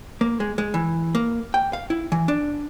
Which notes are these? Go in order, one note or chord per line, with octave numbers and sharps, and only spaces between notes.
A#3
G#3
G#3
E3
A#3
G5
F5
E4
E3
D4